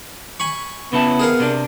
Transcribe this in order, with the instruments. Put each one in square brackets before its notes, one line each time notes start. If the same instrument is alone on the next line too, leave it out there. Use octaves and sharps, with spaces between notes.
[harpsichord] G#5 B5 C#6
[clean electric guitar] C#3 E4 A5 [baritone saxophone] B3
[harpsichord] G#4 A#4 F5
[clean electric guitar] C3 D4